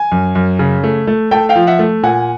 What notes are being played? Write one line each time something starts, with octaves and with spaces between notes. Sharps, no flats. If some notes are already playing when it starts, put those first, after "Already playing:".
Already playing: G#5
F#2
F#2
C#3
A3
A3
A3 G5 A5
F5 G5
F3
E5 F#5
A3
A#2 F#5 G#5